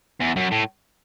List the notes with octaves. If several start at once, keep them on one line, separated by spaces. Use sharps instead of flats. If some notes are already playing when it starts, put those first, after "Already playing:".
E2
F#2
A2